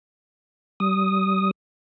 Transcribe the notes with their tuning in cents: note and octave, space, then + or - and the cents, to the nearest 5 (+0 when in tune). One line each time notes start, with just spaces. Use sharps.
G3 -35 D#6 +0